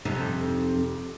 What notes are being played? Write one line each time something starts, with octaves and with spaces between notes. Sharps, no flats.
F2 C3 D#4